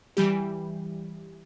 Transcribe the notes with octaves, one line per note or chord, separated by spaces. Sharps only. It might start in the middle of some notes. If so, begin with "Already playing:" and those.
E3 G3 G4